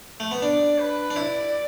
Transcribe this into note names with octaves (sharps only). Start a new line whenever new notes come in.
A3
B3
D4 D5
B4
D4
E4 D5